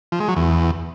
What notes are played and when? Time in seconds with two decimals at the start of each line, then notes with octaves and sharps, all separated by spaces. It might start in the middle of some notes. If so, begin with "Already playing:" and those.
0.12 F3
0.20 G#3
0.28 F#3
0.36 E2